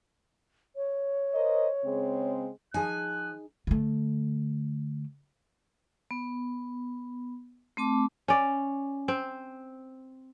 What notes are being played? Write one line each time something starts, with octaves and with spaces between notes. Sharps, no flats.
C#5
A#4 C5 D#5
C#3 G#3 C4
F3 D#4 G#4 G#5 F#6
D3 A3
B3
A3 C4 A5 D6
C#4 D5
C4